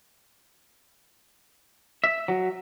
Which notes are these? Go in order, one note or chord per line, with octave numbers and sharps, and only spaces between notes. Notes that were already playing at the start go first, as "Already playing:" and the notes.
E5
F#3